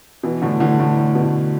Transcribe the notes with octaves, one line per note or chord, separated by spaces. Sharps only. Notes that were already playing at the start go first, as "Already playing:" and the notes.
B2 E3
A2 D3
A2 D3
A2
A2
B2
A2